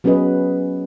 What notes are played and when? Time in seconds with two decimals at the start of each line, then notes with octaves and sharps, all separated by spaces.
0.04 F#3 B3 C#4 G#4 B4 D#5